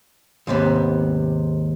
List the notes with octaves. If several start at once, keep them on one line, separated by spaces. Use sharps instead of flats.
D#2 G#2 C3 B3